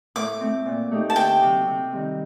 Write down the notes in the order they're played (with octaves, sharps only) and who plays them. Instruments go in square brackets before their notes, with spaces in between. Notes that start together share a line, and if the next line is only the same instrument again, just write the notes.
[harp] A2 [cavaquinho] D6
[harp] A3 C4
A#2
A3 D#4 G4
[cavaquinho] A5
[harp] D2 [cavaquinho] G5
[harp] C3 F#3
C3
D#3 G3 C4